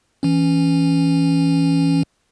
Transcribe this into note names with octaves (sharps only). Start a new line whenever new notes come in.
E3 C#4